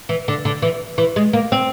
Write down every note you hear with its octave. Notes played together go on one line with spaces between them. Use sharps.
E3
D3
D3
E3
E3
G#3
A#3
C4